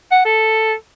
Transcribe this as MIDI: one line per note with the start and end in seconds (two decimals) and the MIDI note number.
0.12 0.24 78
0.25 0.73 69